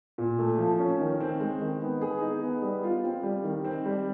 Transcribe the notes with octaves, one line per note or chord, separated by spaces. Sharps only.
A#2
A3
F3
C#4
D#3
C4
G#3
D#3
B3
G#4
D#4
B3
G3
F4
C4
G3
D#3
C4
G3